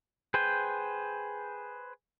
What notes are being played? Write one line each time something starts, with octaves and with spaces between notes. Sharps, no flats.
G#4 B4 C5 G5